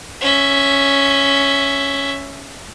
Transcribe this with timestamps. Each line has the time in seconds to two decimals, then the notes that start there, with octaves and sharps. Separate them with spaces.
0.21 C#4 E5